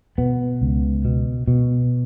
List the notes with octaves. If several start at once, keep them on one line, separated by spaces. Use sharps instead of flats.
B2 B3
C#2
B2
B2